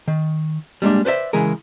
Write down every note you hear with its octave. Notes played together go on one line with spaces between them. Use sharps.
D#3
G3 G#3 A#3 D4
B4 C5 D5 E5
C#3 E3 G#3 G#4 A#4